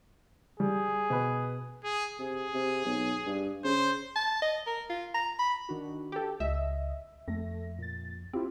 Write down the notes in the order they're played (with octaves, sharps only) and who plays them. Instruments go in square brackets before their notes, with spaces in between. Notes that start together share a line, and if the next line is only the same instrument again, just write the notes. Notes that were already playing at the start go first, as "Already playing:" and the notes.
[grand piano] G3 [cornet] G#4
[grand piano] B2 B4
[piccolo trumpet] G#4
[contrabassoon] C3 [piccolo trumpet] G#4
[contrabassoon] C3
B1
G2
[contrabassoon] C#3 [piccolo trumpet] C5
[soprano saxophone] A5
D#5
A#4
F4
A#5
B5
[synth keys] D#3 D4 F#4
[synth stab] G4 A4
[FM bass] C#2 [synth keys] D#5 [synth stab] E5
[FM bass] F2 [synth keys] A3 A#6
[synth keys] A#2 A6
[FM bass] C4 [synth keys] E4 F4 G4